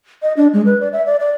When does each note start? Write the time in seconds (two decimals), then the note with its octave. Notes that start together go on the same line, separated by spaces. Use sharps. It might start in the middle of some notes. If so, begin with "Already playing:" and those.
0.22 D#5
0.37 D4
0.53 G#3
0.66 B4
0.80 D5
0.93 E5
1.06 D5
1.20 D5